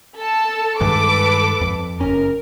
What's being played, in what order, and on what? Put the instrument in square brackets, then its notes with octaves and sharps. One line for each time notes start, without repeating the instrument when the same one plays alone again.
[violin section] A4 A5
[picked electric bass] G2 D#3 G#3 [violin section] A4 B4 D6
[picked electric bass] F2
[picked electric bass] F#1 C#4 [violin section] A#4